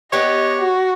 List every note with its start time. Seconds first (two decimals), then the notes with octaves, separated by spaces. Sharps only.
0.13 B3 D4 G4 C#5 D#5
0.59 F#4